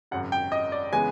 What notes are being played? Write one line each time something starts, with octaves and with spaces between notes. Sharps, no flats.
G#1 F#2 C#3 F#5
G5
D#5
D5
C#3 E3 G#3 B3 G#5